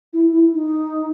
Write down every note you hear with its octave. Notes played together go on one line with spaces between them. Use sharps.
E4
E4
D#4